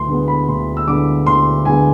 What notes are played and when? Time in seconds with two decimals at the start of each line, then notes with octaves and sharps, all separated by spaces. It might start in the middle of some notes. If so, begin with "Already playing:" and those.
Already playing: D2 C6
0.08 D3 G#3 B3
0.28 B5
0.48 D2 C6
0.77 E6
0.88 D3 G#3 B3 D6
1.27 D2 C6
1.65 D3 G#3 B3 G#5